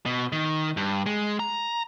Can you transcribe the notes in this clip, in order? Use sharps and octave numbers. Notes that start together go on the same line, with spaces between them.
B2
D#3
G2
G#3
A#5